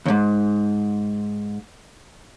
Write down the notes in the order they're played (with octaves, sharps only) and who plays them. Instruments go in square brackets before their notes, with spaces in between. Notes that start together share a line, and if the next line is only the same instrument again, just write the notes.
[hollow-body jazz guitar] D#2 G#2